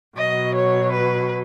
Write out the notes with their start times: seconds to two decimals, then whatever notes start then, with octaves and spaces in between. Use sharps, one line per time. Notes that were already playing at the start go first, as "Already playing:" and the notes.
0.17 B2 F#3 D#5
0.54 C#5
0.91 B4